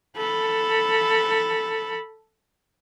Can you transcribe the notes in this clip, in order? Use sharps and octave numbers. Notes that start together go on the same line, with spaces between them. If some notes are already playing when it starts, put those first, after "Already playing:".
A4 B5